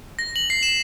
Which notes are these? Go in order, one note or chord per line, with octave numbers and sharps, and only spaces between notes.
A#6
F#7
C7
E7